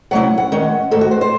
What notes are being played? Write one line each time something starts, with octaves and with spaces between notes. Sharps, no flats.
C3 F#3 A3 C#4 E4 F#5
F#5
D#3 G#3 C#4
G#2 D#3 A3 A4
F#4
C5
C5